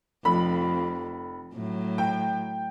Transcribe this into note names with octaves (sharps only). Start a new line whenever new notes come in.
F1 F2 B5
A2 F#3
G5